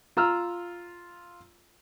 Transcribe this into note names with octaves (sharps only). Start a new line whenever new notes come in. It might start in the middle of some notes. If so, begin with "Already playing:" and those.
F4 A#5 E6 F6